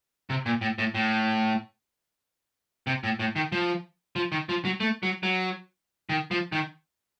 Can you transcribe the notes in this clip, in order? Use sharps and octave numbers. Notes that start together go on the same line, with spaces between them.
C3
A#2
A2
A2
A2
C3
A2
A2
D#3
F3
F3
D#3
F3
F#3
A3
F#3
F#3
D#3
F3
D#3